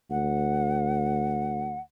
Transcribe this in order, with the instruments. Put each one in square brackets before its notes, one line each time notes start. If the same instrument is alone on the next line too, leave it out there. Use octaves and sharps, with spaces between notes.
[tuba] D2 [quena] F#5